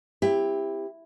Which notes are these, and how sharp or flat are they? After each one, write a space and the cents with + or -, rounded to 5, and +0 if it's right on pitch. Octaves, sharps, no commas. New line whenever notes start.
C4 +0 E4 +5 G4 +20